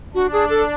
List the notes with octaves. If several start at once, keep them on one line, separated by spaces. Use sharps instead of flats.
D4 F#4
G#4
A4